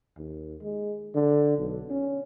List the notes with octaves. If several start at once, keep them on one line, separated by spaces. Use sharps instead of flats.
D#2
G#3
D3
B1
C#4